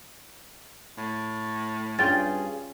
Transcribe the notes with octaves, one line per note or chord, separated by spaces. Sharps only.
A2
G2 C#4 F4 G#4 G5 A6